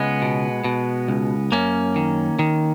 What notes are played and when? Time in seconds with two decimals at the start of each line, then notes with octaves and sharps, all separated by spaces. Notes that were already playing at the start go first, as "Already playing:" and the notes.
Already playing: C#2 G#3 B3
0.22 B2
0.64 B2
1.08 C#2
1.52 F#2 A#3 C#4
1.96 D#3
2.39 D#3